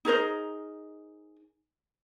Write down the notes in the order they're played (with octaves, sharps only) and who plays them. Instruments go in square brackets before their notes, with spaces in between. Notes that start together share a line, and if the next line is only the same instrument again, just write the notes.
[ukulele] D#4 G#4 A#4 C5